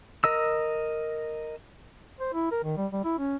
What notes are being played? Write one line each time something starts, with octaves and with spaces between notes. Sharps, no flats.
A#4 D#5 E6
C5
E4
A#4
D#3
G3
G3
E4
C#4